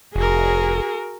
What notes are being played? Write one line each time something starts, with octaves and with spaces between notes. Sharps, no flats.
F1 F#4 G#4 A#4